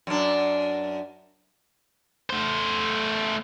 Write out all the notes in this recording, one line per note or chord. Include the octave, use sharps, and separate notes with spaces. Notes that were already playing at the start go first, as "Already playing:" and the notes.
F#2 D4
A3 C5